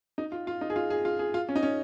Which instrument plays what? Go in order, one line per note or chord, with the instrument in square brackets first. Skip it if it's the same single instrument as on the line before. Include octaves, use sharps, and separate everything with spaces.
[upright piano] D#4
F4
F4
D#4
G#4
F4
G#4
F4
G#4
F4
C#4
D#4
C#4